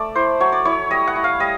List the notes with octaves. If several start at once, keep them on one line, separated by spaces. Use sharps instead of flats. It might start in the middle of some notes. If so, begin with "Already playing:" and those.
Already playing: A3 D5
E4 C5
F#3 C#5
D5
E4 C#5
G3 D#5
F#5
E4
F5
G3 D#5